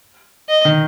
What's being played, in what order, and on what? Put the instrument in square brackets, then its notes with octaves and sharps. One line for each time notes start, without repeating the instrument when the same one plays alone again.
[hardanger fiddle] D#5
[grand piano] D#3